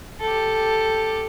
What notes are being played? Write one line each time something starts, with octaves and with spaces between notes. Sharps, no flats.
G4 A4